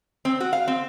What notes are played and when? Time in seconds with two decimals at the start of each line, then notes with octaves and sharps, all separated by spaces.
0.25 C4
0.40 F#4
0.53 F5
0.68 C4